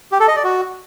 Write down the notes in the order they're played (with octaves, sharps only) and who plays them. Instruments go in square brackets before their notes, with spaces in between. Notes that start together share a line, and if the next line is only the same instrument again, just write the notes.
[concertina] G4
A4
D#5
D5
F#4